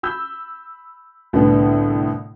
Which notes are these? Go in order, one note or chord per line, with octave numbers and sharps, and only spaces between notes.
B5 E6 G6
C2 A2 D3 B3